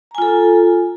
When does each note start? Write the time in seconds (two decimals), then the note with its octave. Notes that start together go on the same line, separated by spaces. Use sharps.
0.11 A#5
0.15 G#5
0.18 F4
0.22 A4